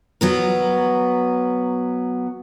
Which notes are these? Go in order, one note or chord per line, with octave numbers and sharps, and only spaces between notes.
F#3 B3 A#4